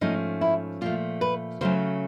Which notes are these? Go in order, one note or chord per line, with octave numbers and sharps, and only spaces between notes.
G#2 F3 A3 C#4 D#4
E4
A#2 F3 A3 F4
B4
C#3 F#3 A3 C#4 C5